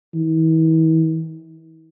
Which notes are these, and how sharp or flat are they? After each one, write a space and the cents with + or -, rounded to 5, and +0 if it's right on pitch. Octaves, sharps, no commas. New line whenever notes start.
E3 -40